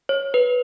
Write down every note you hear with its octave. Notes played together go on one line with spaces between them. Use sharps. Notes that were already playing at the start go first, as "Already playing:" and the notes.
C#5
B4